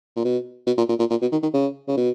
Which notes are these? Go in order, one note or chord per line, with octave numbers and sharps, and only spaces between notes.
A#2
B2
B2
A#2
A#2
A#2
A#2
B2
D#3
D#3
C#3
C#3
B2